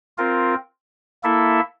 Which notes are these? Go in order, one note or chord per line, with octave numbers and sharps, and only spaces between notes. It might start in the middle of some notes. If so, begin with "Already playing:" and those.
C4 F4 A#4
A#3 E4 A4 E5